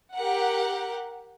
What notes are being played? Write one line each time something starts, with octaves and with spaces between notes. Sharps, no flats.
G4 A#4 F#5